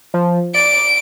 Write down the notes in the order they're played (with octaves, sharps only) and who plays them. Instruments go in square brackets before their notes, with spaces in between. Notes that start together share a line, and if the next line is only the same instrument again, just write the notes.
[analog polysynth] F3
[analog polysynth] D5 [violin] D7